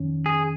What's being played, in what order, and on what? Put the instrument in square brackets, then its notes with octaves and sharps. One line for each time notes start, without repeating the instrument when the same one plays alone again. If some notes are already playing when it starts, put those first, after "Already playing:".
Already playing: [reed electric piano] F2 D#3 C#4
[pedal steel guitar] G#4